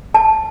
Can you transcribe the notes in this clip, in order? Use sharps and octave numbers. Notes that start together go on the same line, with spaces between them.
A5